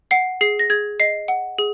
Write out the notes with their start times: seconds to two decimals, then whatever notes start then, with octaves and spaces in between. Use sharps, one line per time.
0.11 F#5 C7
0.41 G#4 C7
0.59 A#6
0.70 G#4 G#6
1.00 D#5 C7
1.28 F#5
1.59 G#4